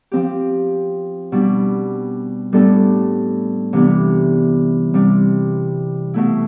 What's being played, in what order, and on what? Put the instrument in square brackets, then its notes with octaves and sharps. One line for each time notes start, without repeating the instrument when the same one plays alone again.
[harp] F3 C4 G4
B2 G3 D4
A2 G3 B3 D4 A4
C3 E3 G3 B3 D4
C3 G3 C4
B2 A3 E4